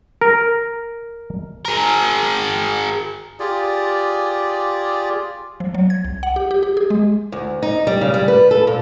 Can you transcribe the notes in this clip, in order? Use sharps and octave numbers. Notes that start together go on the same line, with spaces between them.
A#4
G#4 A#4
F4 G4 G#4 D5
F3
F#3
G#6
C2
F#5
G4
G4
G4
G#4
G#3
D2
D#4
G3
C#3
G3
B4
A4
A#2